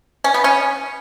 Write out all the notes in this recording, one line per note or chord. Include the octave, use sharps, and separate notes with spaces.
C#4
B3
C#4